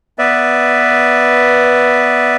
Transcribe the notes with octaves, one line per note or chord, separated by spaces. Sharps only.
B3 B4 D5 E5